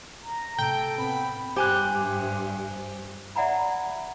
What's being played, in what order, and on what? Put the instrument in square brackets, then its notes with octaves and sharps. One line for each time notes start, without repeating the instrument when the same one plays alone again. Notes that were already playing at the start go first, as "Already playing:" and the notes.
[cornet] A#5
[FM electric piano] A2 C3 [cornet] A4 [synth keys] G5
[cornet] B3 [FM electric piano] C4 [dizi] B5
[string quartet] G2 [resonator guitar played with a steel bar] G4 [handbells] C5 G#5 F#6
[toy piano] D5 E5 F#5 G#5 A#5 B5